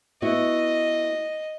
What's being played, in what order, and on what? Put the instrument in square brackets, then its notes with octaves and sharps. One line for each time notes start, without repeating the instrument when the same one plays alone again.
[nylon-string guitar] B3 E4 F#4 [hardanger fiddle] D#5